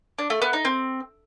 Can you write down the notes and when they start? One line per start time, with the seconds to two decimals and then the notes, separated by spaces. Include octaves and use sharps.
0.19 D4
0.30 A3
0.42 B3
0.53 D#4
0.65 C4